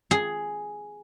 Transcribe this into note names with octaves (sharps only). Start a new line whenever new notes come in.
G#4